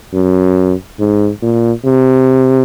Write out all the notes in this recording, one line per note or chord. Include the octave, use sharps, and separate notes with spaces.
F#2
G#2
A#2
C3